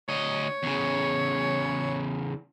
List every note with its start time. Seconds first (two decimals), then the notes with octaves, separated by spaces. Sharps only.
0.09 D2 C#5 D#5
0.63 E2 C#3